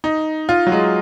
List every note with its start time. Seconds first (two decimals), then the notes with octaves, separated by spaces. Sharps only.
0.04 D#4
0.49 F4
0.67 F#3
0.72 G#3